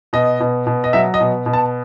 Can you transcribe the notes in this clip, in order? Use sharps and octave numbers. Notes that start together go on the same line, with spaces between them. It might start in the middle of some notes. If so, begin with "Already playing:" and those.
B2 D#5
B2
B2
D#5
F#3 E5
D#5
B2
B2
A5